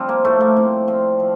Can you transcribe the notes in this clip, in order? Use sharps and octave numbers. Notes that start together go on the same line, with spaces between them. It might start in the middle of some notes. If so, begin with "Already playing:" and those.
Already playing: F3 G3 C4 D4
A#3
A2 A3
A#3
A2 C4
F3 C4
F3